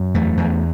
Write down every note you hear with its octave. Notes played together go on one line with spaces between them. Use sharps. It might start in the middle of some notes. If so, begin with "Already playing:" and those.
Already playing: F#2
E2 A3
E2